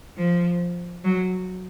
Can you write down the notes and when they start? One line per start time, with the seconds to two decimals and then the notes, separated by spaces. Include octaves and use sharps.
0.17 F3
1.04 F#3